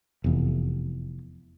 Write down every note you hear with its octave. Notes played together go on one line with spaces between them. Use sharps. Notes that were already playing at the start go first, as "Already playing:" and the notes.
F1 E2